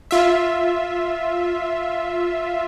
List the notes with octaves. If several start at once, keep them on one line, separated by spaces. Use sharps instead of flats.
F4 E5